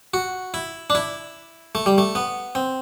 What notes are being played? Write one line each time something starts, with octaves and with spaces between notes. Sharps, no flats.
F#4
E4
D4
E4
A3
G3
A3
B3
C4